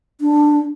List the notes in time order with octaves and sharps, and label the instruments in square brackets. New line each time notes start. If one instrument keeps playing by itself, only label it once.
[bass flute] D4